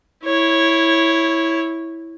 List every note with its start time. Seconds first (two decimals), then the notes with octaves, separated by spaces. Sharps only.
0.24 E4 C#5